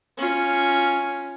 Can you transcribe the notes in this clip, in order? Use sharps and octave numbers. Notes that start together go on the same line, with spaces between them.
C#4 F4